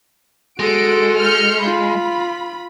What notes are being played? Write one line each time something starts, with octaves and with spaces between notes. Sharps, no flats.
G#3 F#4 A4 D7
F6 G6 C#7
F4 B5